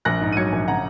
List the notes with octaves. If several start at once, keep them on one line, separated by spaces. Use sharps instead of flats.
A#1 F#6 A#6
G#2
D#7
F#3 G#6 C#7
A#1
C#3 F#5 A#5